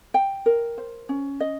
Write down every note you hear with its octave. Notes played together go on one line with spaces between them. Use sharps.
G5
A#4
C5
C#4
D#5